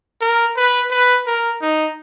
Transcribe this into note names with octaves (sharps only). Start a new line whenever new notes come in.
A#4
B4
B4
A#4
D#4